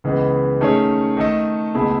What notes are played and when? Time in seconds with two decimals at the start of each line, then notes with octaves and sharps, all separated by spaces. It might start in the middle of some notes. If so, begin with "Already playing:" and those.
0.04 C#2 C#3 E3 G#3 B3
0.61 D#3 A3 C#4 G#4 C#5
1.17 D#3 A3 D#4 A4 D#5
1.74 C#2 B2 A3 E4 G#4